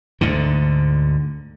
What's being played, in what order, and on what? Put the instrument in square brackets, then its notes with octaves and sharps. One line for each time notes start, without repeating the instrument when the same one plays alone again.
[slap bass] D2 G#2 D3